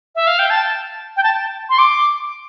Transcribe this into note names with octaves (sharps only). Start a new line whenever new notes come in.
E5
F5
G5
A5
G5
A5
C6
D6